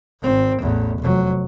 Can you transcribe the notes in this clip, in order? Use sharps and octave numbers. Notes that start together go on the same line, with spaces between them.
G#1 C4
A1 E2
F1 F#3